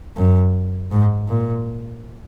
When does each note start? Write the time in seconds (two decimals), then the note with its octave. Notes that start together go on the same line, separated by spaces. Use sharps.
0.17 F#2
0.91 G#2
1.28 A#2